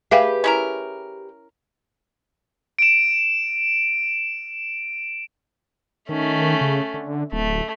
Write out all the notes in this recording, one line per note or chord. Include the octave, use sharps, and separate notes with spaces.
G4 G#4 B4 E5 F5 G5
C#4 E4 A#4
D7 E7
D#3 A3 C#4
C#3
D3
D1 A3